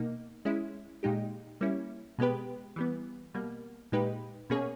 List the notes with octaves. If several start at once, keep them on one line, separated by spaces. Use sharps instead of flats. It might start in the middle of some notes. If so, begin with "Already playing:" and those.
Already playing: B2 A#3 D#4
G#3 C#4 E4
A#2 G#3 D#4 G4
G3 A#3 C#4 E4
B2 G#3 B3 G4 B4
E3 G3 B3
B2 G3 A#3
A#2 G#3 D#4 G4 B4
B2 A#3 C#4 G#4 C#5